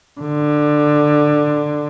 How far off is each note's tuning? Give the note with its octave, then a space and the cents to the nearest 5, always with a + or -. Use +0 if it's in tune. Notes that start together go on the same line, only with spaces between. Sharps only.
D3 +15